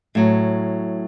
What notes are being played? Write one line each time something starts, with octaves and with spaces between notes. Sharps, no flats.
A2 F#3